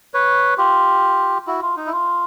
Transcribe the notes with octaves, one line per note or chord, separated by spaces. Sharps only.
B4 C#5
F4 G4
E4 F#4
F4
D#4
E4
F4